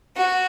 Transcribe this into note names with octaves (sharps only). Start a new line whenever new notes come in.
F#4